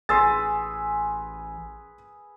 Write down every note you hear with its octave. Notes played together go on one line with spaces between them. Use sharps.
A1 G#4 B4 C6 E6 A6